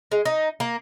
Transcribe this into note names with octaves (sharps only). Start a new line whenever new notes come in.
G#3
D#4
A#3